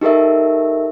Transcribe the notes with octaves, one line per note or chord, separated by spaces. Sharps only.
D#4 G4 A4 A#4 E5